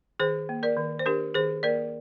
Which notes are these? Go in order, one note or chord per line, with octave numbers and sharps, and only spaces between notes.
D#3 G#4 C5
A#3
A#4 D5
D#3
C5
D4 G4 A#4
D#3 G#4 C5
A#3 A#4 D5